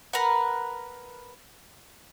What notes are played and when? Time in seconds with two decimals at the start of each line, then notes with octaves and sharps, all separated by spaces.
0.13 A#4 B4 F#5